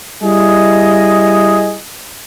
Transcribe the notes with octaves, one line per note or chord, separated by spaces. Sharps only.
G3 E4 G#4 D#5